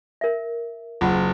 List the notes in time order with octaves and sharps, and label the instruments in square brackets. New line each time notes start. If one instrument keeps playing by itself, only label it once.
[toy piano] A#4 E5
[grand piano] F#1 [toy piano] F4 F#5 B5